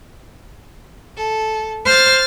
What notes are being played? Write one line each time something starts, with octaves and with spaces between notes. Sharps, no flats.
A4
C5 F6 A6